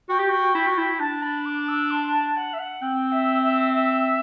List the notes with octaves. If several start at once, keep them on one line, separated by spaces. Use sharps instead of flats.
F#4 G5
G4
F#4
E4
F#4
E4
D4 A5
B5
D6
E6
C6
A5
F#5
E5
F#5
C4 G5
E5
E5
E5